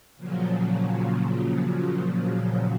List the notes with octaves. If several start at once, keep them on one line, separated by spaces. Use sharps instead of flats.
A#2 C#3 F3 F#3